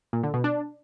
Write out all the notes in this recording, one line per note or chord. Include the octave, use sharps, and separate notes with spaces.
A#2
D3
B2
D4